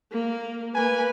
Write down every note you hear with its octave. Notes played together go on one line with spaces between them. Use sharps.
A#3
A#3 B4 G#5